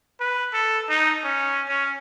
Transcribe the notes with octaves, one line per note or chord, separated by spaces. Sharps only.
B4
A4
D#4
C#4
C#4